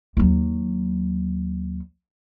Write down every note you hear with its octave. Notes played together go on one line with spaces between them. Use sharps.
D#2 F#3